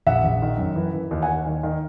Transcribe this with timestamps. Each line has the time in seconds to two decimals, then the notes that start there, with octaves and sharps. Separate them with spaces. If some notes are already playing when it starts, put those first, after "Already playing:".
0.07 A#1 E5 F#5
0.24 A#1
0.42 D#3
0.58 F#2
0.76 E3
0.93 E3
1.11 D#2
1.22 F#5 G#5
1.28 D#2
1.46 D#3
1.63 D#3